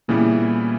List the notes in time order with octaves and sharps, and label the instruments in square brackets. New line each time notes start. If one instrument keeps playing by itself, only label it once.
[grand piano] A#2 [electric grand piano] C#3 E3 G3 B3 E4